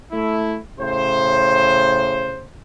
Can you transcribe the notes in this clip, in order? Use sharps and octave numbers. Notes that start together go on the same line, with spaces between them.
A3 E4
A2 C#3 C5